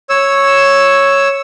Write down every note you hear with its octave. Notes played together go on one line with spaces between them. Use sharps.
C#5 E6